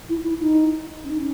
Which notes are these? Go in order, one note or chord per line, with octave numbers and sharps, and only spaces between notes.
E4
E4
D#4
C#4
D#4
C#4